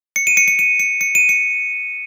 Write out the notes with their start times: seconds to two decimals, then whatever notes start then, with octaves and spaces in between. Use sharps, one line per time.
0.16 C#7
0.27 D#7
0.37 C#7
0.48 C#7
0.59 D#7
0.79 C#7
1.01 C#7
1.15 D#7
1.29 C#7